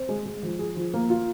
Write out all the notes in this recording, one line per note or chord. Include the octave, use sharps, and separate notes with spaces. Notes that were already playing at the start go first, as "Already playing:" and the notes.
Already playing: C4
G#3
G#3
F3
G#4
F3
A#3
F4